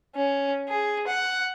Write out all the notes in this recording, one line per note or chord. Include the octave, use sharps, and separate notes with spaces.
C#4
G#4
F#5